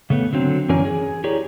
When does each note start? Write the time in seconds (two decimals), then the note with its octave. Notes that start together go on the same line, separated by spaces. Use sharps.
0.10 C#3 A3 B3
0.33 D3 F#3 C4
0.69 F#2 E3 C#4 A#4 D5 G#5
0.85 G#4
1.24 E4 G4 G#4 A#4 C#5 D5